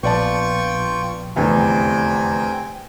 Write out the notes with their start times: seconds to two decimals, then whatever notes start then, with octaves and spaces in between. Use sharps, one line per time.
0.03 A#1 B3 F4 D5 G5 A5 C#6
1.36 F1 E2 D3 C4 G5 G#5